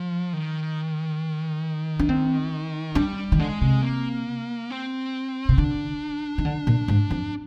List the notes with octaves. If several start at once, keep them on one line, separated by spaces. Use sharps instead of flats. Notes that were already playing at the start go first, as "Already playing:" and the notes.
Already playing: F3
D#3
D4
C4
G3 D4
D#3
D3 G#3
C3
A#3
C4
C3
D3 D4
D#3
D3
A#2
G#2
F2